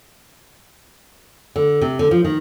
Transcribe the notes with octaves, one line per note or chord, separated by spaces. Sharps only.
D3
C3
D3
F3
D#3